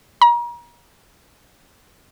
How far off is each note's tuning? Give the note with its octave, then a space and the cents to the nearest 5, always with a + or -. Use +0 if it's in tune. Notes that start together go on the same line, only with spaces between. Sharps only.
A#5 +35